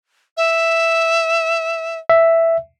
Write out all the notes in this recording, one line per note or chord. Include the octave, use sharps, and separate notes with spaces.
E5
E5